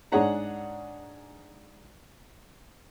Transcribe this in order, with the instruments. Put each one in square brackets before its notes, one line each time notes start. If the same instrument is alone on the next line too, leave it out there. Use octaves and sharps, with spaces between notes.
[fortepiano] G#2 D4 G#4 C#5 F#5 A#5